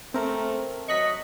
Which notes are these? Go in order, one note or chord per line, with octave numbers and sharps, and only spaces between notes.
A3 C4 A#4
F#3 D#5 C#6 F#6 B6